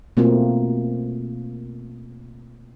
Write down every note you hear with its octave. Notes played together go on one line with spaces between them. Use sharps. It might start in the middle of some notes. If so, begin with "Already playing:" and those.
B2 A3 A#3 C4 F4